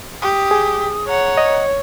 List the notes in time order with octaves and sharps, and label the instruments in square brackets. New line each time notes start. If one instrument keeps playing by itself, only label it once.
[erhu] G4 [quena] D#6
[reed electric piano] G#4
[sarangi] C#5 [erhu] F#5 [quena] A#5
[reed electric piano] D#5